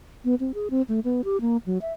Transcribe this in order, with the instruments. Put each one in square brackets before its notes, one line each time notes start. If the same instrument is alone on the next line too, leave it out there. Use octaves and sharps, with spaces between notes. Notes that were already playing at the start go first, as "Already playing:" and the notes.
[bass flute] B3
C4
G#4
C4
A3
B3
G4
A#3
F#3
E5